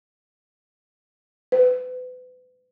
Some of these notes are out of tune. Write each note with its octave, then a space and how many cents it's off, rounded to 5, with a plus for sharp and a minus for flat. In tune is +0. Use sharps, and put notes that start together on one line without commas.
B4 +35